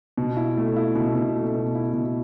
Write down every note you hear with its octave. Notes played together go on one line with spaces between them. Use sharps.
B2
E4
A3
E4
B2
B2
A3
B2
E4
B2